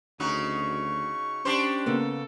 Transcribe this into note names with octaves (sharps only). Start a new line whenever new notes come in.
D2 C#3 D#4 F#4 C#6
C#4 D4 G4 C5
C#3 A#3 B3 A4